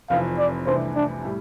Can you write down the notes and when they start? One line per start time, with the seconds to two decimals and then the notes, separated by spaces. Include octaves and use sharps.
0.10 F1 F2 E3 F5
0.38 D5
0.66 C2 C3 E3 A3 D4 C5
0.96 D4
1.25 A2 G3